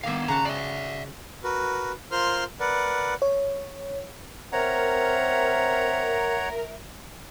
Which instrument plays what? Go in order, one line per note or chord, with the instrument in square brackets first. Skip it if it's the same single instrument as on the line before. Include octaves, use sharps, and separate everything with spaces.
[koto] D#3 A#3 E5 [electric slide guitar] B3 F5
[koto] C#3 F#4 A5 [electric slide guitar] A#5
[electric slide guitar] D5 E5
[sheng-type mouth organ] F#4 A#4 B4
F4 A#4 C5 C6 F6
A#4 B4 D5 F#5
[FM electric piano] C#5
[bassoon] C4 [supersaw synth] A#4 [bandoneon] C#5 F#5 A#5 [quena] E5